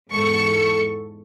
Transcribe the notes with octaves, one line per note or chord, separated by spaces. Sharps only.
E2 G#2 A4 C#6 C#7